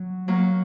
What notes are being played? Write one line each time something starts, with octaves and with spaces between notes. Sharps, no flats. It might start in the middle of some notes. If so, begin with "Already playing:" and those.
Already playing: F#3
F#3 A#3